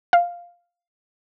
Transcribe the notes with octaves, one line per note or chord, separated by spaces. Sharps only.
F5